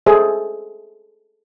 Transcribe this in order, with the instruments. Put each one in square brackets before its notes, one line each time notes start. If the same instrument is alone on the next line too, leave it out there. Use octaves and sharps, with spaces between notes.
[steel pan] G#4 A4 C5 E5